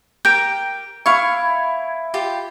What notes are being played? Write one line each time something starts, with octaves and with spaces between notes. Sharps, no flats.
G4 A#4 G5 G6 D7
E4 F5 C#6
F4 G4